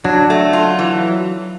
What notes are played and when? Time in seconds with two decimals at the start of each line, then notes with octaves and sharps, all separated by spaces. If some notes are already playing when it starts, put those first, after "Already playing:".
0.04 F#3 D4
0.30 A3
0.53 F4
0.79 E3